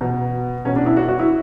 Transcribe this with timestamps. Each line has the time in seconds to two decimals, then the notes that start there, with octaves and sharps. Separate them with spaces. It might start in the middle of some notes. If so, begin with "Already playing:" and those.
0.01 B2
0.65 B2 C#4
0.76 D4
0.86 E4
0.97 F#4
1.08 F#4
1.19 E4